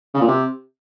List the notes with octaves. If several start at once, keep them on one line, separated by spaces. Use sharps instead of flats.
C#3
A#2
C3